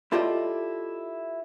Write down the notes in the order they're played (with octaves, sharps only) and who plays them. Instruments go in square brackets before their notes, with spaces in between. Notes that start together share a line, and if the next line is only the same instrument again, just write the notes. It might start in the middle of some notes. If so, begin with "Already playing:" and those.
[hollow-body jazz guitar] E4 F4 G4 A4 D5 D#5